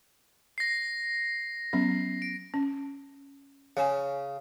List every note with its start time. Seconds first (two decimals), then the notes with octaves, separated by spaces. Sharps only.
0.58 A#6 C7
1.73 F#3 B3 C#4
2.22 D7
2.54 C#4
3.77 C#3 F5 G#5